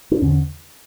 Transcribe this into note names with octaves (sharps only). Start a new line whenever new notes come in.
D4
E2 D3 C#4